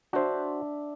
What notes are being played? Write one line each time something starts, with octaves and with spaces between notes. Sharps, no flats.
D4 F#4 C5 E5